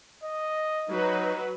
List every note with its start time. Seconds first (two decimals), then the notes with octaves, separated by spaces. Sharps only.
0.24 D#5
0.90 F#3 D#4 B4